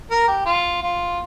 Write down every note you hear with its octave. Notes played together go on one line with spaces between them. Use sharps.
A#4
G4
F4
F4